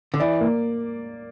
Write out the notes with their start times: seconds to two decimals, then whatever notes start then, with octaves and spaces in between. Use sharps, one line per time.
0.14 D3
0.20 E3 D5
0.41 A#3